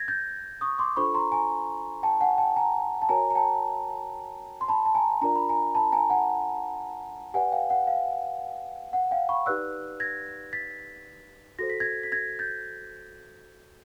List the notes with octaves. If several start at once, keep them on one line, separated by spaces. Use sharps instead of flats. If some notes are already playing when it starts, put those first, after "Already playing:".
Already playing: G#6 A#6
G6 A6
C#6 D#6
C6 D6
D4 F4 A4 C5 B5 C#6
A#5 C6
G#5 A#5
G5 A5
F#5 G#5
G5 A5
G#5 A#5
A5
F#4 A#4 C#5 G#5 A#5
A#5
G5 A5
C6
A5 B5
A5
G#5 A#5
D4 F4 A#4 D5 A#5
B5
G#5 A#5
A5 B5
G#5 A#5
F#5 G#5
G4 B4 D5 F#5 G#5
F5 G5
F#5
F5
F#5
F5 G5
B5 C#6
D#4 G4 B4 D5 E6 F#6
G#6 A#6
A6 B6
F#4 A4 C5 A#6
B6
G#6 A#6
B6
G#6 A#6
G6 A6